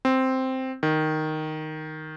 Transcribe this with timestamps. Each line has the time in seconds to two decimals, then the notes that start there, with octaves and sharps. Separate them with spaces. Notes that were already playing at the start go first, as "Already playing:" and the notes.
0.05 C4
0.83 D#3